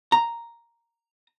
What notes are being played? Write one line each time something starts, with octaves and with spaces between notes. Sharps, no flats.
A#5